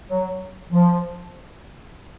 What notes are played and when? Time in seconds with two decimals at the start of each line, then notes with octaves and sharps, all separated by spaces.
0.09 F#3
0.71 F3